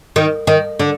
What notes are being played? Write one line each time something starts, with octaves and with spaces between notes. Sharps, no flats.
D#3
D#3
D3